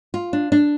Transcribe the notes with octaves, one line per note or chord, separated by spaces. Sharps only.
F4
D4
D4